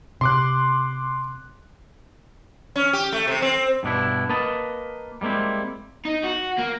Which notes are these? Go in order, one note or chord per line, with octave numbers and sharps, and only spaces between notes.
C3 C6 D6 F#6
C#4
G4
A3
C3
C4
G2 B2 D4 E4
A#3 B4 D#5 A5
G3 G#3 A#3 C4 E4
D#4
F#4
A#3